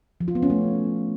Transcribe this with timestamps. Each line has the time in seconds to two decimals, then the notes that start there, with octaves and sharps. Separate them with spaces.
0.20 F3
0.28 F4
0.35 B3
0.43 C#4
0.50 A3